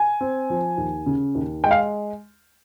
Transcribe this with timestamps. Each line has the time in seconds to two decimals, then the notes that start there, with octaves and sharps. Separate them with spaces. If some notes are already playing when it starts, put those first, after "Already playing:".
Already playing: G#5
0.21 C4
0.50 F3
0.77 D#2
1.06 C#3
1.35 D#2
1.64 G#3 G5
1.71 F5